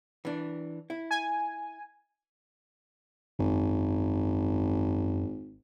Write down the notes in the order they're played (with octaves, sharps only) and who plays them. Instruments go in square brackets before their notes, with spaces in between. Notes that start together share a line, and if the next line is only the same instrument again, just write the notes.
[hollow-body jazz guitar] E3 D4
E4
[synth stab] G#5
[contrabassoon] G#1 [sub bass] F#2